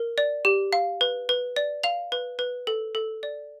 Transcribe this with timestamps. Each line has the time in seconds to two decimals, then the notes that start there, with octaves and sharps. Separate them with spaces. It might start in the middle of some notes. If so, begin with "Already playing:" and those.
Already playing: A#4
0.18 D5
0.45 G4
0.73 F5
1.01 B4
1.29 B4
1.56 D5
1.83 F5 F7
2.12 B4
2.39 B4
2.67 A4
2.95 A4
3.23 D5